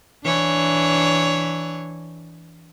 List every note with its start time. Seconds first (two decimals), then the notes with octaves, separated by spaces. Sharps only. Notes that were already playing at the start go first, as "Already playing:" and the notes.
0.25 E3 D4 C#5